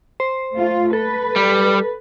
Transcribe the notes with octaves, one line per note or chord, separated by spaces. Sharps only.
C5
A3 F4
A4 B4
G3